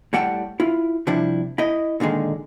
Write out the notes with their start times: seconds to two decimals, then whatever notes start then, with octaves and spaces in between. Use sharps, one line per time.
0.13 A2 G3 F#5 G5 A5
0.60 E4 F4
1.07 C3 F3 G3 D4 E4
1.58 E4 D#5
2.00 A#2 D3 D#3 G#3